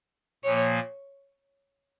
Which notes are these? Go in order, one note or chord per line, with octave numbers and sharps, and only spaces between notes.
A#2 F3 A#3 C#5